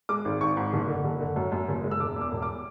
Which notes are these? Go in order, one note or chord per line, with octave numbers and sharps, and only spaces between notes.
G#3 D6
G#1
G#1 C#6
G#2
F#1
D3
F#1
D3
F#2
F#2
F#1
G#3
E6
E1 D6
E2
D6
E1
D6